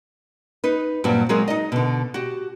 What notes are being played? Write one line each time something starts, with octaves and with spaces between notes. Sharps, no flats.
D#4 B4
G2 A#2 F#3 G3 C4
F#3 G#3 C4 G#4 A#4 D#5
D#4 D#5
B2 D3
F#4 G4